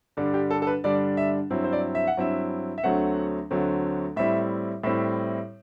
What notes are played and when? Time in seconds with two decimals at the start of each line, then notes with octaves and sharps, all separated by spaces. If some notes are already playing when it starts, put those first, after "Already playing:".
0.17 G2 D3 G3 D4
0.34 G4
0.50 A4
0.62 A4
0.67 B4
0.84 G2 D3 G3 D4 D5
1.17 E5
1.50 G2 F#3 C4 E4
1.64 C5
1.73 D5
1.95 E5
2.07 F#5
2.17 G2 F#3 C4 E4 E5
2.78 E5
2.84 D2 D3 F#3 A3 C4 F#5
3.51 D2 D3 F#3 A3 C4
4.16 A2 G3 C4 E4 E5
4.84 A2 G3 C4 E4 E5